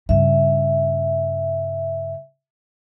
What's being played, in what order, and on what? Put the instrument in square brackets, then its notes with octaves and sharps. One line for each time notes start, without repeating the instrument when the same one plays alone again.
[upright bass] G2 C#3 [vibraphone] E5